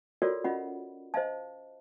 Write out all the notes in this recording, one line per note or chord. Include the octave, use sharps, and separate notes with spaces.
F4 F#4 A4 A#4 C#5 D5
C#4 F4 D#5 F#5 B5
C5 D#5 F5 A5